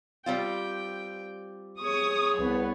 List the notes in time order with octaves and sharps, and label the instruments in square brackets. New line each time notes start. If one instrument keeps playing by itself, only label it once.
[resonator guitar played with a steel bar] G3 C4 F4 [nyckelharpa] G5
[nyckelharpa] G#4 C#5 [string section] C#6 D#6
[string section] C2 B3